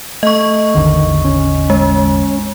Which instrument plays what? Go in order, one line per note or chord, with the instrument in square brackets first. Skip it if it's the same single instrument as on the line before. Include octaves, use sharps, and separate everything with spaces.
[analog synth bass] A3 [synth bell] D#5 C#6
[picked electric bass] A1 E2 D3 [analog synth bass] D#3
[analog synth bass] C#4
[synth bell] G#3